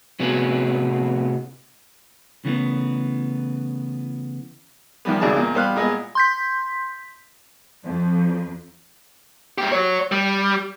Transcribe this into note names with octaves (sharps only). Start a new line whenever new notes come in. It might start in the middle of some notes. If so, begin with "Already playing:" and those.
A2 C3 B3 C#4 F#4 G#4
C#3 E3 A3 B3
E2 D#3 F3 G3 B3
G#1 C#2 D#3 G#4 D5 A5
E2 A#2
G3 B3 C5 F5 F#6
A#2 G#3 B3 D#5 G#5
C6 G6 B6
F2
G#2 G4
F#4 C#5
G3